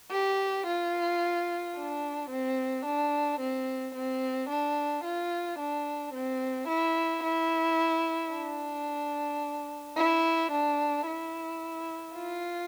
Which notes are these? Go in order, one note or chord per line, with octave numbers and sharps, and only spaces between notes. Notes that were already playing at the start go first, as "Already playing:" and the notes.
G4
F4
D4
C4
D4
C4
C4
D4
F4
D4
C4
E4
E4
D4
E4
D4
E4
F4